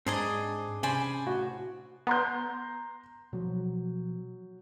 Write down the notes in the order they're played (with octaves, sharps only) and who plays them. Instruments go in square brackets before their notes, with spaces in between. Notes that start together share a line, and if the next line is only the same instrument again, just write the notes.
[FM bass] G#2 [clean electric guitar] C4 C5 A#5 [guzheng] D4 G#4 D#5
[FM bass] C3 [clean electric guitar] C#4 [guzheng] C5 D5 B5 [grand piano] G#5
[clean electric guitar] A2 [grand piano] F#4
[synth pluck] B3 [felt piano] A#5 C6 G6
[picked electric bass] B2 F3 [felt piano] F#3